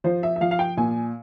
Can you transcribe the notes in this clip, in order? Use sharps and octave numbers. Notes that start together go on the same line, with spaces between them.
F3 C5
E5
E5
F3 F5
F5
G5
A#2 G#5